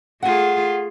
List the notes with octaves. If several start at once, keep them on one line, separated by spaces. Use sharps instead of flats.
A3 F4 G#4 F#5 G#5